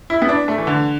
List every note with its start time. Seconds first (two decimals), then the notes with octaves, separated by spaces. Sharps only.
0.10 E4
0.22 B3
0.29 D4
0.48 A3
0.58 E3
0.67 D3